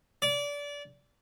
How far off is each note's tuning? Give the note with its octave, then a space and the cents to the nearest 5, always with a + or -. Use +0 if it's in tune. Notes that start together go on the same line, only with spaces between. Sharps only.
D5 -25